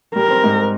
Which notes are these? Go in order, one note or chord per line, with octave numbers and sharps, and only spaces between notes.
G3 A#4
C4
G#2